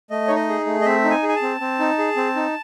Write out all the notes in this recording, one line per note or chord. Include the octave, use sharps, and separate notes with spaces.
A3 D#5
D#4 C#5
D#5
G#4
A3
D#5
C4 E5
D#4
G#5
G#4
G#5
A5
C4
C4
D#4
G#4
C4
D#4